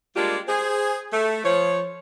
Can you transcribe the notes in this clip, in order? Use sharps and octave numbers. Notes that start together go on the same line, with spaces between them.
G3 G#3 A#3 D4 F4 G4
G#4 C5
A3
F3 C#5